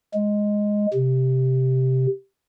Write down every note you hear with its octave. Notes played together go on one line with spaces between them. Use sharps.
G#3
C3